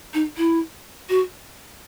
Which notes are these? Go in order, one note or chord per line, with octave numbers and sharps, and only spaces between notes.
D#4
E4
F#4